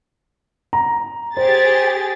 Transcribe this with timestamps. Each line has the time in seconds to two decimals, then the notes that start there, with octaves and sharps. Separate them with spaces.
0.73 A#5
1.37 G4 G#4 C5 A6